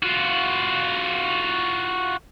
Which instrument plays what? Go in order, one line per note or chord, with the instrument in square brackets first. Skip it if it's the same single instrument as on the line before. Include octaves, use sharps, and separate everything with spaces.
[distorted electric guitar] F4 F#4